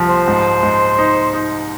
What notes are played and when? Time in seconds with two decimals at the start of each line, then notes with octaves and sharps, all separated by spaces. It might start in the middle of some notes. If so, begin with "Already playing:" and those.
Already playing: C2 F3
0.09 C5
0.28 G#2
0.63 G#2
0.98 D#4
1.33 D#4